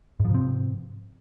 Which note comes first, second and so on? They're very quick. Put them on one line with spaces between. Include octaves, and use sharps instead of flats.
G#2 F3 C3 C4